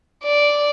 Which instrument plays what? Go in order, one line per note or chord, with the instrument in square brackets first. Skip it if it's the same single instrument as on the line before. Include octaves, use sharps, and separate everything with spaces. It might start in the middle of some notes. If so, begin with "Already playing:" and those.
[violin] D5